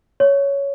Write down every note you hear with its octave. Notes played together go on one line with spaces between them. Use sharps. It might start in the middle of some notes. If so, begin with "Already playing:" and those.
C#5